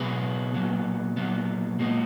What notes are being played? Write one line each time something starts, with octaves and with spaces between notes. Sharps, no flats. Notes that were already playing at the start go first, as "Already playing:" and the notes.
Already playing: B2 F#3 B3 G#4 B4
A#2 F#3 B3
A#2 F#3 B3
A#2 G#3 B3